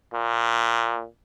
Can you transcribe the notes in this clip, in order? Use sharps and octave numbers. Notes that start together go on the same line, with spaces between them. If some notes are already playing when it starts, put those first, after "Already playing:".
A#2